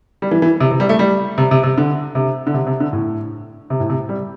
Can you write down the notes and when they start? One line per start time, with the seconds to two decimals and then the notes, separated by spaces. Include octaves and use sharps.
0.22 G3
0.31 E3
0.42 E3
0.60 C3
0.71 C3
0.80 G3
0.89 A3
0.99 G3
1.38 C3
1.51 C3
1.63 C3
1.78 D3
2.15 C3
2.47 D3
2.54 C3
2.67 C3
2.80 D3
2.93 A2
3.70 C3
3.80 A2
3.90 C3
4.09 G3